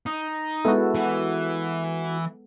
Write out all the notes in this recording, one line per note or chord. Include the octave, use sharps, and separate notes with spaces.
D#4
G#3 B3 E4 F#4 A4
E3